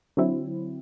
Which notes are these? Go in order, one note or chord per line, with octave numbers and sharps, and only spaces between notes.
D3 F#3 C4 E4